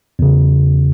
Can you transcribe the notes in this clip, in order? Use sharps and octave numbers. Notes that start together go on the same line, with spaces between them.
E2 C#3